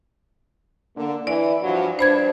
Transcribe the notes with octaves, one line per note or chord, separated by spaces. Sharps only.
D3 A#3
E3 D5
G2 F3 F#3
G2 D4 C5 B5 G#6